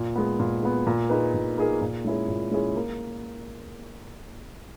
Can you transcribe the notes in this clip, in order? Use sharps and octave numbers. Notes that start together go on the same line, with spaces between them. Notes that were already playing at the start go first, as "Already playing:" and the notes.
Already playing: A#2
G#3 B3
A#2
G#3 B3
A#2
A#3 D#4 G#4 B4
A#2
A#3 D#4 G#4 B4
A#2
G#3 C#4 E4 G#4
A#2
G#3 C#4 E4 G#4
A#3